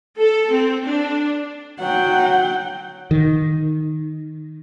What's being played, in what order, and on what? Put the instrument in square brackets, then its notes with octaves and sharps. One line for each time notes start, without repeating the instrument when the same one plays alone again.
[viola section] A4
C4
D4
[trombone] F#3 [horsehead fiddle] F#5 G5
[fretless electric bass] D#3